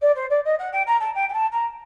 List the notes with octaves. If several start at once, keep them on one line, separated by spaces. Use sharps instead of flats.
D5
C5
D5
D#5
F#5
G5
A#5
A5
G5
G5
A5
A#5